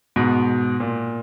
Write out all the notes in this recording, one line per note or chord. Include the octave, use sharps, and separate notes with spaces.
G#2 B2
A#2